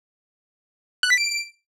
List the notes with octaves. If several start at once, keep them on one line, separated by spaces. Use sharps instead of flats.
F#6
B6
D7